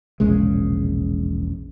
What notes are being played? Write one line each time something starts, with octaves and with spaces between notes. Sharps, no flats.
E1 A#1 C#3 G#3